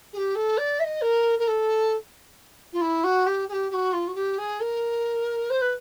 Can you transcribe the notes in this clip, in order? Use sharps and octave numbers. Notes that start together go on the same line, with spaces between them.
G#4
G4
A4
D5
E5
D#5
A#4
A#4
A4
F4
E4
F#4
G4
G#4
G4
G4
F#4
F4
F#4
G4
G#4
A#4
C5
B4